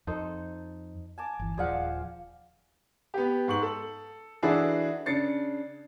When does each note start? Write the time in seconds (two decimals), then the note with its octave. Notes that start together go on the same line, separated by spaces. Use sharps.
0.07 F2 D#4 A4 C5
1.18 G#5 A5 D6
1.39 G1 E3
1.58 D#1 F3 G#4 C5 D5 F5 F#5
3.14 B3 G4
3.48 G#2 C#6 F#7
3.62 A4
4.43 E3 D4 E4 F#4 G#4 A4
5.06 C#3 D4 A6 C7 C#7